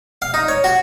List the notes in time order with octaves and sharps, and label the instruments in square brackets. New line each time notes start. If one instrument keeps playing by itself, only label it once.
[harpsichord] F5
D#4
C#5
F#4